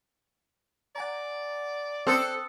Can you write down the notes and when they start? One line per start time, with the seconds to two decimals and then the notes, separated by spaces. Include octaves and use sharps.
0.96 D5 F#5 G#5 A#5
2.07 C4 A4 D#6 E6 F#6